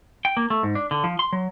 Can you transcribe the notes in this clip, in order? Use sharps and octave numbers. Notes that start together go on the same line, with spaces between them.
G5
A#3
A3
G#2
D4
D3
F3
C6
F#3